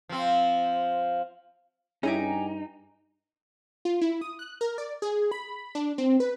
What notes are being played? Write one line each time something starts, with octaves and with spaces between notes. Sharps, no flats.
F3 C4
G2 C#4 D#4 E4 G4 G#4 G#5 A#5
F4
E4
D#6
F#6
A#4
D5
G#4
B5
D4
C4
B4